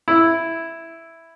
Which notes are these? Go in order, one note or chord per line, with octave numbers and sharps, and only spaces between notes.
E4